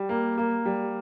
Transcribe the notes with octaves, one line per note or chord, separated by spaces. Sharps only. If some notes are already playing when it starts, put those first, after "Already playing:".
Already playing: G3
A#3
A#3
G3